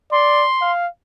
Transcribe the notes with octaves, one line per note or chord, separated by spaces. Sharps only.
D5 C6
F5